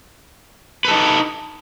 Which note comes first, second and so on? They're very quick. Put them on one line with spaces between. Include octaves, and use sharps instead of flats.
B4 A4 D#4